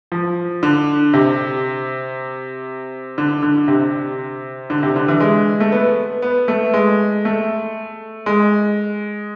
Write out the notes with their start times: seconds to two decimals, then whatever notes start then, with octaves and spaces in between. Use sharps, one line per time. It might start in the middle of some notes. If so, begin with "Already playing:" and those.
0.12 F3
0.63 D3
1.14 C3
3.18 D3
3.43 D3
3.68 C3
4.70 D3
4.83 C3
4.96 D3
5.08 E3
5.20 G#3
5.60 A3
5.72 B3
6.22 B3
6.48 A3
6.74 G#3
7.25 A3
8.26 G#3